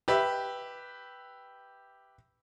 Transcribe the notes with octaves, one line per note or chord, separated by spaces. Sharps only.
G4 B4 E5